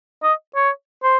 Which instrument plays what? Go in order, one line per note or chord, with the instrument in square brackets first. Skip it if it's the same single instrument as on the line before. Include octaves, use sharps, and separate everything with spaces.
[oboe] D#5
C#5
C5